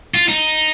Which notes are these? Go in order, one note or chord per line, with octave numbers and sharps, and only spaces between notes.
F4
D#4